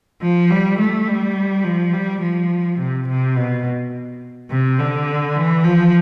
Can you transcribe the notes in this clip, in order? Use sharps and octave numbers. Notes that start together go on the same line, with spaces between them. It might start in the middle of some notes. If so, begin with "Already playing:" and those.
F3
G3
A3
G3
F3
G3
F3
C3
C3
B2
C3
D3
E3
F3